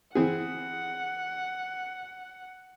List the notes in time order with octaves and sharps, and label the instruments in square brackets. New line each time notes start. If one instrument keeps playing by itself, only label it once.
[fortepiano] E3 C4 G#4 [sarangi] F#5